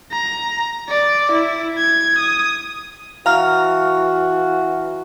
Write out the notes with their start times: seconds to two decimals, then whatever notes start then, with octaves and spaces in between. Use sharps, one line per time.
0.12 A#5
0.89 D5
1.32 E4
1.78 G#6
2.19 D#6
3.26 E3 F#4 F5 A#5 F6